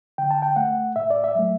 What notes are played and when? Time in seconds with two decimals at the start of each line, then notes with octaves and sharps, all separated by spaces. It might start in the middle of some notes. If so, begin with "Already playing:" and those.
0.18 D3 G5
0.31 A5
0.42 G5
0.56 A3 F#5
0.96 A2 E5
1.10 D5
1.24 E5
1.35 F#3 A3